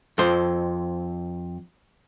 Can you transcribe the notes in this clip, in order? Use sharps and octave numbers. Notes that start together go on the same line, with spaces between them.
F2 C5